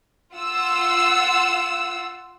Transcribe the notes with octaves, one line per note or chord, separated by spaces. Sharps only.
F4 F#5 E6